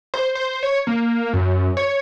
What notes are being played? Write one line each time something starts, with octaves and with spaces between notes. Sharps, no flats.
C5
C5
C#5
A#3
F#2
C#5